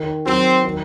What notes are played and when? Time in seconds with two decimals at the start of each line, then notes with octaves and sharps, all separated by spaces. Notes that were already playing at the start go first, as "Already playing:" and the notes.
Already playing: D#3
0.26 F#3 C4
0.64 D#3